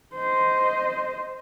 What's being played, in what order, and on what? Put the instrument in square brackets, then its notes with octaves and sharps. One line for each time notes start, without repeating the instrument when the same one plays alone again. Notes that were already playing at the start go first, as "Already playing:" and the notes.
[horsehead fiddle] C5 D#5